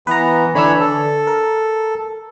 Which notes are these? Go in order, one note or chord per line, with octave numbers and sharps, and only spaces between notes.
E3 B3 B4 A#5
D3 E3 D4 C#5 B5 E6
A4
A#4